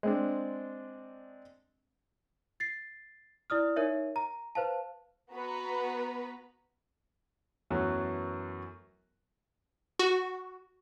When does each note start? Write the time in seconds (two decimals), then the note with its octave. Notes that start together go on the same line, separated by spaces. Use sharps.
0.03 G#3 C4 D4
2.60 A6 C7
3.50 E4 D5 D#6 F6
3.76 D#4 A#4 C#5 E5
4.16 A#5
4.55 B4 C5 F5 A5
5.32 B3 F#4 B4 A#5 B5
7.70 F#2 E3 F#3 A3 B3 F#4
9.99 F#4